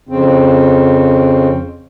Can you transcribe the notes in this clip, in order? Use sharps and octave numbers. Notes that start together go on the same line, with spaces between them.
F2 C#3 C4